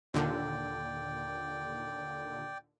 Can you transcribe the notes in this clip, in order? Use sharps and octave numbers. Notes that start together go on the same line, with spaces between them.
D#2 A#2 D3 D5 G5